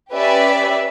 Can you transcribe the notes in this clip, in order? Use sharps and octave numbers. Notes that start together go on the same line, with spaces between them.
C#4 G4 B4 D5 E5 B5